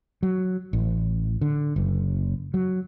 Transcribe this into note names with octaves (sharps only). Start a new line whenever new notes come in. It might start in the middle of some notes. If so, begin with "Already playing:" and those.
F#3
A1
D3
F#1
F#3